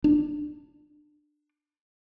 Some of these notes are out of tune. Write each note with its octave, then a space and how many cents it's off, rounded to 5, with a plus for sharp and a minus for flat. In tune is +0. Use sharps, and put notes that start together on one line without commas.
D4 +20